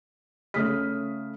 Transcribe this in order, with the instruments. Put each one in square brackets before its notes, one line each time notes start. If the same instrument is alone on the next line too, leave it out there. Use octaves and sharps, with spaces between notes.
[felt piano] C#3 A3 D#6 F6 B6